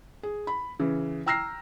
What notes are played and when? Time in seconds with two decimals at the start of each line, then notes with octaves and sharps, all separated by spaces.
0.23 G#4
0.47 B5
0.79 C#3 E3
1.26 G5 A#5 E6 F6 A#6 C7